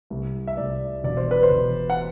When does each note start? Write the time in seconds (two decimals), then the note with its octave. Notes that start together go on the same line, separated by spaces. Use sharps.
0.10 C2
0.47 E5
0.57 C2 D5
1.04 E1 D5
1.17 C5
1.31 B4
1.43 C5
1.50 E1
1.90 F#5